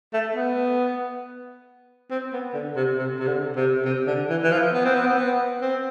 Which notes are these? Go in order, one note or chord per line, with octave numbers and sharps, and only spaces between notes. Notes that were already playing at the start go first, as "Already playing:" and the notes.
A3
B3
C4
B3
D3
C3
C3
C3
D3
C3
C3
D3
E3
E3
F3
B3
C4
B3
C4
B3
C4